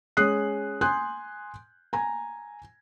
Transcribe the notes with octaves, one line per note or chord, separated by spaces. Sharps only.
G#3 C#4 D#6 F#6 C7
G#5 C6 D#6 F#6 G6
G#5 A#5 G#6